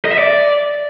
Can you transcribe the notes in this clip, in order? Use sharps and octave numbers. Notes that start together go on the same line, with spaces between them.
D#5
E5
D5